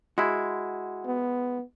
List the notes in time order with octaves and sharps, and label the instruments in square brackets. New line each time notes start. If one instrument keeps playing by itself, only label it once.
[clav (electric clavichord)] G#3 E4 [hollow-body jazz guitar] F#4
[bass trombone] B3